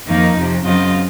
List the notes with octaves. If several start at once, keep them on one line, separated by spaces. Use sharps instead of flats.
F2 D#3 A#3 D#4
F2 C3 F3
F#2 C#3 F#3 C4 F4 D#5